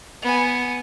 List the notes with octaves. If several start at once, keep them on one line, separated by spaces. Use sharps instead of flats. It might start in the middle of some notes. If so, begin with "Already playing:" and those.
B3 G#5